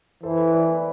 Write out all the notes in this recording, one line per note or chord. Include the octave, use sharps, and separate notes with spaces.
E3 A4 C5
B4 D5